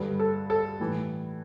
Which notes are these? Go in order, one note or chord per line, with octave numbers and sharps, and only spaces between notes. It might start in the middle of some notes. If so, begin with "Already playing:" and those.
Already playing: G2 D3 B4
A4
A4
A2 E3